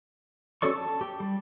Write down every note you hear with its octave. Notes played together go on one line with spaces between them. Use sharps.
C#4 F#4 A4 D5 C#6
A5
G4
G3